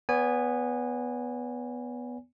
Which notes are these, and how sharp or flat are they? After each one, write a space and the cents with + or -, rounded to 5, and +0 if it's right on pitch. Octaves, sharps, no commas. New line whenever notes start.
B3 +0 C#5 +45 G#5 -20